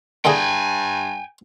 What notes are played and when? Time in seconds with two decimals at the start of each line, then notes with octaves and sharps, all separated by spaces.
0.25 G2 D3 E4 G#4 G5 G#5